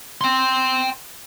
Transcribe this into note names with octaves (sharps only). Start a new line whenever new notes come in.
G5 C6